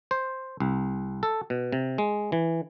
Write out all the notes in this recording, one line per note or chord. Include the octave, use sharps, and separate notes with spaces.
C5
C2
A4
B2
C3
G#3
E3